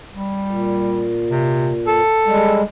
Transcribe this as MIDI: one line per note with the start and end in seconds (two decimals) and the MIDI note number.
0.14 1.12 55
0.47 2.01 46
1.31 1.72 48
1.87 2.60 69
2.26 2.62 55
2.26 2.62 56